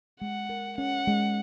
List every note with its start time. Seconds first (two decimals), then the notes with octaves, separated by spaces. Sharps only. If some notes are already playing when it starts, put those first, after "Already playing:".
0.21 G#3 F#5
0.49 A#4
0.78 C#4 F#5
1.07 G#3